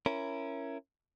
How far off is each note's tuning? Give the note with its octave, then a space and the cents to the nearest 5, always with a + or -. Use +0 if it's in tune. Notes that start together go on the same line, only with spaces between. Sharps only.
C#4 +0 E4 +20 A#4 +0